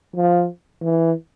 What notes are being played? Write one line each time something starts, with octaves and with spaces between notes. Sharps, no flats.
F3
E3